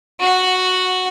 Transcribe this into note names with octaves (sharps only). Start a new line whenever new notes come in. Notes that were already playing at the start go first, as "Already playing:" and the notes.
F#4 F#5